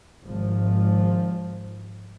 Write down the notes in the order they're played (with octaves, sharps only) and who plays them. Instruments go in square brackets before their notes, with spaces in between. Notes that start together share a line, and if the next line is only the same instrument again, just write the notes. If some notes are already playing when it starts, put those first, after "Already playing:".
[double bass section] G#1 F3